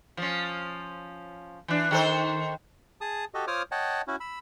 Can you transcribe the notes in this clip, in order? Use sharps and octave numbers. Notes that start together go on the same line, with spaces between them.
F3 C#4
E3 D4
D#3 A4 C5
G#4 A5 D#6
F#4 G4 A4 D#5
F4 C5 C#5 D6 D#6 F6
C#5 D#5 F#5 G5 A5
C#4 E4 F#4
B5 E6